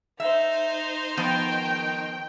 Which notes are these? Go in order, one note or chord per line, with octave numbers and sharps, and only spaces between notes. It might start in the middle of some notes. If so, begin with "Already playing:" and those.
D#4 C5 E5
D#3 F3 B3 G5